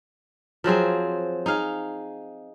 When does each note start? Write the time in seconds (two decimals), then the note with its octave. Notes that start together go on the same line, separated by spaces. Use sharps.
0.64 F3 F#3 C4 G#4
1.46 D#4 G#4 F5